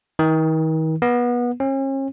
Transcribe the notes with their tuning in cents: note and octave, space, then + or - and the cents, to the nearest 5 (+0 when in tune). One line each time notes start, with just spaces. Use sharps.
D#3 +40
B3 -25
C#4 -40